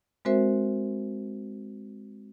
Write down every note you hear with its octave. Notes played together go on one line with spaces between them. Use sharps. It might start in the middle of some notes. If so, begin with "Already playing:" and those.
G#3 C4 F#4 A#4 C5 E5